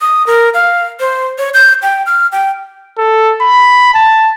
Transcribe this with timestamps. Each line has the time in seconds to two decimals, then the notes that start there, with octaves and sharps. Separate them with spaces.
0.01 D#6
0.27 A#4
0.54 F5
1.00 C5
1.38 C#5
1.54 G6
1.83 G5
2.06 F6
2.32 G5
2.98 A4
3.41 B5
3.94 A5